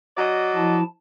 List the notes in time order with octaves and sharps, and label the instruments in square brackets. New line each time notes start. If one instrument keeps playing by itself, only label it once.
[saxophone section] F#3 D5 D#5
[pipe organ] F3 E4 A5